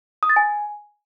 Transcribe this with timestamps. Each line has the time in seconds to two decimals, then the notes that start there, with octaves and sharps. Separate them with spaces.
0.23 D#6
0.30 A6
0.36 G#5